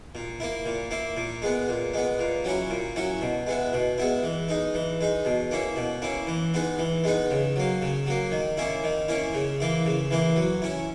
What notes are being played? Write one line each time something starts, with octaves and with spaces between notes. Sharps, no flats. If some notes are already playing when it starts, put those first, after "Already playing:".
A#2
A#3 E4
A#2
A#3 E4
A#2
G#3 B3
A#2
G#3 B3
A#2
F#3 C#4 E4
A#2
F#3 C#4 E4
B2
G#3 B3 E4
B2
G#3 B3 E4
E3
G#3 D#4
E3
G#3 D#4
B2
A#3 C#4 E4
B2
A#3 C#4 E4
E3
G#3 B3 D#4
E3
G#3 B3 D#4
C#3
F#3 A#3
C#3
F#3 A#3
D#3
A#3 C#4 E4
D#3
A#3 C#4 E4
C#3
E3 A#3 E4
C#3
E3 A#3 E4
F#3
C#4 E4